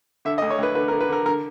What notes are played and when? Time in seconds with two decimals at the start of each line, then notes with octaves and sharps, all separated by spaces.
0.25 D3 E5
0.38 D#5
0.42 D2
0.50 C#5
0.58 D2 B4
0.75 D3 B4
0.88 A#4
0.92 D3
1.01 B4
1.09 D3 A#4
1.26 D3 A#4